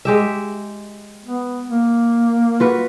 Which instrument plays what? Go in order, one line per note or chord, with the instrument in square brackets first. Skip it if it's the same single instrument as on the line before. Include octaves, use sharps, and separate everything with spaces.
[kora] G#3 G4 E5
[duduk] B3
A#3
[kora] F4 F#4 B4